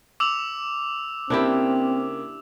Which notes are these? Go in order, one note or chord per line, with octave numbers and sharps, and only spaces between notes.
D6 E6 F7
C#3 A#3 C4 D4 E4 G4